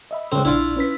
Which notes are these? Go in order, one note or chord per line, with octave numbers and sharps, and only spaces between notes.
D#5 E5 B5
C#2 C#3 C4 A4
A#1 D4 E4 F4
C#4 B4 B6